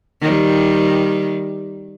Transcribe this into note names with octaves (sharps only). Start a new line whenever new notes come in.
D#3 G3